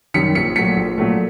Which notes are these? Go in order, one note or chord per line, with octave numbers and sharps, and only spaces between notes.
F#2 D#3 G3 B6 C#7
A#1 B6 C#7
A#2 F#3 A3 B6 C#7
A#1
A#2 F#3 A3